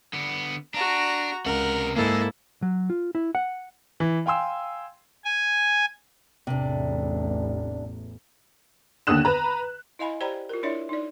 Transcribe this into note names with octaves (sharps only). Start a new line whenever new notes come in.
D3 B3
D4 F#4 A#5
C#2 C3 A#4 F#5
G#2 G#3 A#3 E4 A4
F#3
F4
E4
F#5
E3
F5 G5 G#5 C6 E6
G#5
A1 E2 C3 D4
D#2 D3 D#6 F#6 E7
B4 A#5
E4 D#5 F5 G#5 B5
G4 C5 D5 G5 A#5 B5
F4 A#4
D4 E4 C#5 D5 E5
D#4 D5